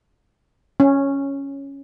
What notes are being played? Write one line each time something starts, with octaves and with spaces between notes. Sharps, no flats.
C#4